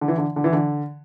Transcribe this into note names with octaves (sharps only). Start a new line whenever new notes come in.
D3
E3
D3
D3
E3
D3